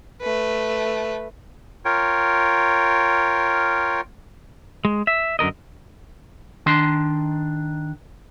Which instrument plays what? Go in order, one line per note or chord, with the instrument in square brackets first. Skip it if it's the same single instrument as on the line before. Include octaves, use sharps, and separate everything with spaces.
[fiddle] A3 B4
[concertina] F4 A#4 C#5 G5
[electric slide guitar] G#3
E5
F#2 D3 A#4 D#5
[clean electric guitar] D#3 D4 C6